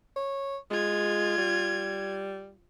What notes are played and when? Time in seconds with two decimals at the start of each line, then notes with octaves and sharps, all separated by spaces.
0.16 C#5
0.70 G#3 F4 G#6
1.38 G3